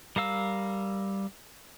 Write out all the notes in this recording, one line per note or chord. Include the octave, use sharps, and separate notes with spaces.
G3 A#4 F5 E6